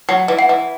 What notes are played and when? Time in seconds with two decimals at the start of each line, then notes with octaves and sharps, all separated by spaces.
0.09 F#3 F#5
0.28 E3
0.39 F#5
0.49 E3